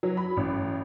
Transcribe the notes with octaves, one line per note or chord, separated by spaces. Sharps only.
F#3
B5
A1